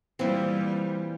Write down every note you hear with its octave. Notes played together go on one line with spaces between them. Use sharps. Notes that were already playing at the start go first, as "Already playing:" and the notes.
A#2 E3 G3 C4 E4